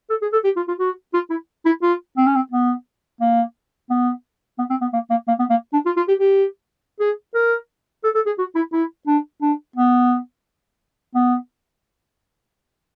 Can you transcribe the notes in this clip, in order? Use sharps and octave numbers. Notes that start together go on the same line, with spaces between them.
A4
G#4
A4
G4
F4
F4
F#4
F4
E4
E4
F4
C4
C#4
C4
B3
A#3
B3
B3
C4
B3
A#3
A#3
A#3
B3
A#3
D4
F4
F4
G4
G4
G#4
A#4
A4
A4
G#4
F#4
E4
E4
D4
D4
B3
B3